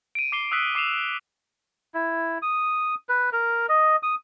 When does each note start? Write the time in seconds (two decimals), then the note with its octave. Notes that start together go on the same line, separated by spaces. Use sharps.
0.15 D7 D#7
0.32 D6 C7 G7
0.51 D#6 E6 F#6 B6
0.75 D6 C7 E7 F7
1.94 E4
2.42 D#6
3.09 B4
3.33 A#4
3.69 D#5
4.03 D#6